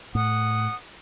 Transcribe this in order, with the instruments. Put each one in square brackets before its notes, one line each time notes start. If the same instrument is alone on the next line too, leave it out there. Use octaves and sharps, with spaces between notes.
[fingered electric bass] A2 [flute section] F#5 D#6